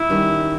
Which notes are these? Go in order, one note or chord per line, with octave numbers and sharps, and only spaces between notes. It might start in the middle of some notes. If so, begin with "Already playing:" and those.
Already playing: E4
D#3 G3 C#4